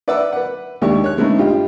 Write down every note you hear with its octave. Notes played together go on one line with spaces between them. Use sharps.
B4 D5 E5 F#5 D6 E6
B4 F#5
D#2 G#3 D4 G4 C#6
C#5 F#6
D3 G#3 A3 B3 C#4 D#4
G2 F4 G4 D#5